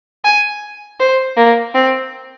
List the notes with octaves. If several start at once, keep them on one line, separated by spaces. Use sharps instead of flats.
G#5
C5
A#3
C4